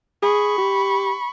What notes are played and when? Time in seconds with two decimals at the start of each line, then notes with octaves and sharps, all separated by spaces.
0.22 G#4 B5 C#6
0.58 G4